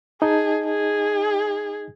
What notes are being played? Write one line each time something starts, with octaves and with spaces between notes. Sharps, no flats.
D#4 G#4 D#5 A5
G#4